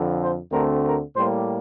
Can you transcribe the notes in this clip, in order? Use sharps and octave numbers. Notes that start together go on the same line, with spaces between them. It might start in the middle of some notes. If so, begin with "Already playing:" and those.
Already playing: F2 D3 F3
C5
D2 D3 A3 C4 A#4
A#4
A2 G3 A#3 C5